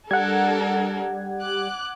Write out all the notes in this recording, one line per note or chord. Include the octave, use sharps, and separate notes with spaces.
G3 D4 A4 A#4 F#5 G#6
D6 F#6